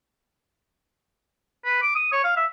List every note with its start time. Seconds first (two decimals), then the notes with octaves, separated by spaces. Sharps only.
1.65 B4
1.82 D6
1.95 D#6
2.12 C#5
2.24 F5
2.37 E5